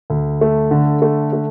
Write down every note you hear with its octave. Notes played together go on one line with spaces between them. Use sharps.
D2
A3
D3
A3
A3